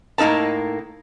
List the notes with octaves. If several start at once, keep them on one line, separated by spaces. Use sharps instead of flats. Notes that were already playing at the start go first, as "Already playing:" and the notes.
A2 A#3 D#4 B4 A5